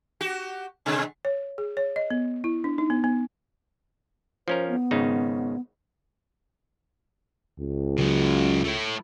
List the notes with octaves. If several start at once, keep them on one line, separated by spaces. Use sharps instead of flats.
F#4 G4
B2 D3 G#3
C#5
G#4
C#5
D#5
B3
E4
D4
D#4
B3
B3
F3 C#4 A#4 C5
B3
G#1 C#3 D#4
C#2
C#3 F#3
A3 E4